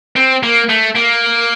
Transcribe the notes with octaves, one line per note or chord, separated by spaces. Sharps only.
C4
A#3
A3
A#3